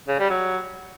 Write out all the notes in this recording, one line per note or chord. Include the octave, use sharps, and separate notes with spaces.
C#3
G3
F#3